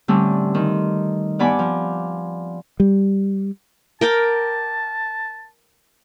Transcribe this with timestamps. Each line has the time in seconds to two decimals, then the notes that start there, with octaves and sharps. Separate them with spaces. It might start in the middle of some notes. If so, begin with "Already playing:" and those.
0.08 A2 D3 G3 A3 C4 C#4
0.54 D#3 C4
1.39 G2 B3 D5 G#5 B5 D6
1.59 F3
2.80 G3
4.01 A#4 G5 A5 D6